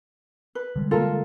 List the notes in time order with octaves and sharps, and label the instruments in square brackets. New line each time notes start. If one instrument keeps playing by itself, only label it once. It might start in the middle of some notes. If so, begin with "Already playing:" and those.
[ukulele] B4
[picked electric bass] D3 G3 G#3
[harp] A#3 F4 [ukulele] A4 A#4